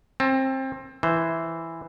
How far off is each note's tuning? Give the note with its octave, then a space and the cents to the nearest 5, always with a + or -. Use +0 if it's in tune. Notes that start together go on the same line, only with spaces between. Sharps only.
C4 +25 A5 +0
E3 +0 C5 +0